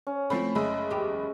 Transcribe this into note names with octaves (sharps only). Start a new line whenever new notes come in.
C#4
F3 A3 C4 E4 B5
F#1 G#3 G#4 D#5 E5 B5
E2 G4